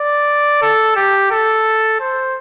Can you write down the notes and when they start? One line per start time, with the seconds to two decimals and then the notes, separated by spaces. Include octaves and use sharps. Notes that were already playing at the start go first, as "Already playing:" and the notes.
Already playing: D5
0.62 A4
0.96 G4
1.31 A4
2.00 C5